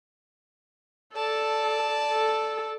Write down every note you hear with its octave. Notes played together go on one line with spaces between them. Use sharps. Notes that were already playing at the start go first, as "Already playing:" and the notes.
A4 D5 A5
A4